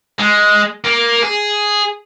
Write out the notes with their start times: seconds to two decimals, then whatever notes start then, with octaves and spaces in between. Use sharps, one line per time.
0.19 G#3
0.85 A#3
1.23 G#4